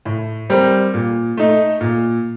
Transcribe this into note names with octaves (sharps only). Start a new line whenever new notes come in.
A2
G3 C4 G4 A#4
A#2
A3 D#4
A#2